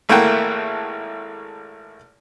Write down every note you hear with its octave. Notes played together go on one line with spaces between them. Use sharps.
G#1 A3 A#3 E4 F#5 G5